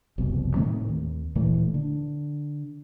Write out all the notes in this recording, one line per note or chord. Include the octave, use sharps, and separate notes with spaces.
F#1 C2 F2 B2
A2 D#3 A3 C4
D#2
D1 A#2 E3 A3
D3